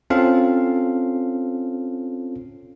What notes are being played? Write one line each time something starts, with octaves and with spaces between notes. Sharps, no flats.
C4 C#4 F4 A4 F5